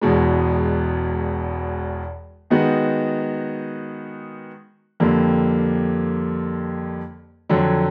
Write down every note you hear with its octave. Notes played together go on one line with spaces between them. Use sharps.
E1 E2 B2 G#3
D#3 G#3 B3 D#4 F#4
F2 D3 G3 A#3
F2 D3 F#3